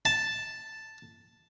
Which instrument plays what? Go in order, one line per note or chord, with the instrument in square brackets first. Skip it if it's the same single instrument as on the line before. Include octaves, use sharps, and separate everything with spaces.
[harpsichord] A5